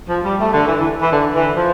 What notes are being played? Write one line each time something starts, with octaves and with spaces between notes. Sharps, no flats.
F3
G3
A3
D3
E3
E3
E3
D3
E3
F3